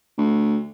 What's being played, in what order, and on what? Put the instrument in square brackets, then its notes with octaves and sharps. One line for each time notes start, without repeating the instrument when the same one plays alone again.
[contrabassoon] D2